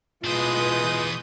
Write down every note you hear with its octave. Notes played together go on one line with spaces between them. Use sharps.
B2 E3 G#3 F4 B4 C5 D#6 G6